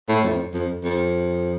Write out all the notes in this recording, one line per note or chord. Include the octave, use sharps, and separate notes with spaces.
A2
F2
F2
F2